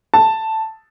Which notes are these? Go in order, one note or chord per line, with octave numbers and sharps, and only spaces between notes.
A5